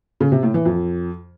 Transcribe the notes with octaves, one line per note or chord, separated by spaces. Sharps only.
C#3
C3
A2
E3
F2